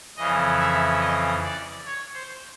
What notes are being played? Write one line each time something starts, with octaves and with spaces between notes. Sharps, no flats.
F2 C#3 E3 D#5
E5
D#5
D5
C#5
C5